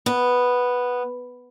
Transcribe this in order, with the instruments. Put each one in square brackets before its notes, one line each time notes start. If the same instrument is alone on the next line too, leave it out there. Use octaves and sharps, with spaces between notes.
[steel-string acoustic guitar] B3